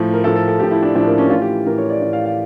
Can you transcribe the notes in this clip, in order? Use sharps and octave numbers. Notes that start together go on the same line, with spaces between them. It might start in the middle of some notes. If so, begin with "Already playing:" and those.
Already playing: A2 F3
A#4
A2 F3 A4
A4
A4
A2 F3 G4
E4
D4
A2 F3 D4
A#3
C#4
A2 E3 F4
G4
A2 E3 A#4
C#5
D5
A2 E3
F5
F5